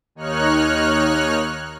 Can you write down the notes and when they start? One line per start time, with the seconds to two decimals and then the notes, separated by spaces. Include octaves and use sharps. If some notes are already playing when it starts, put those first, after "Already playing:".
0.15 D#2 D#4 C#5 F6 F#6